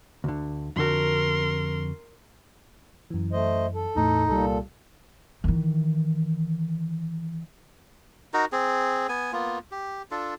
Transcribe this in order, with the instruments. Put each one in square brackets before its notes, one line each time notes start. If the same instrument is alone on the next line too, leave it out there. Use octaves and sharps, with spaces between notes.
[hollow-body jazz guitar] D2 D3
[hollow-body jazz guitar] F2 D3 F#4 [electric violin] A#4 C6
[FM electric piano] F#2 E3
[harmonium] A3 C5 D#5
A4
[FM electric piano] E2 A2 [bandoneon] D#4
[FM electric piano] C2 G3 [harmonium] A#2 A4
[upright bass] D#3 E3
[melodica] D#4 F#4 A#4
C4 G#4
B3 G#5
A#3 B3 F4
G4
D4 F4 A4